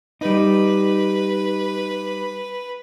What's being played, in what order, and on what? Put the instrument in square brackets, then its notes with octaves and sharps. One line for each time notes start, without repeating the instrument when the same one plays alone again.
[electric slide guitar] G3 D#4 [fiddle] B4